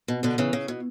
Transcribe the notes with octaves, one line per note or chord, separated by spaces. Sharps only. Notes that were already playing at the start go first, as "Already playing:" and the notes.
B2
B2 D3
C#3 E3
C#3
B2